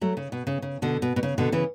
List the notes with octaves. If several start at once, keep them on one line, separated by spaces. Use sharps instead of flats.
F#3 A3
C#3
B2
C#3
C#3
B2 D3
B2
B2
C#3
B2 D3
C#3 E3